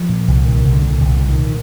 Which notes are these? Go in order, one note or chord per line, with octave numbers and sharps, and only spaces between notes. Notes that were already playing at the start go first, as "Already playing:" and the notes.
Already playing: F3
A#2
C2
A#2 D#3
C2
D3
A#2
C2 D3
A#2
D#3